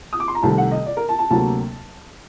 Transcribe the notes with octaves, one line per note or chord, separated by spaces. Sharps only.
D#6
D6
C6
A#5
C2 C3 D#3 A3 A5
F#5
D#5
D5
A#4
A5
A5
D2 C3 F#3 A#3 A5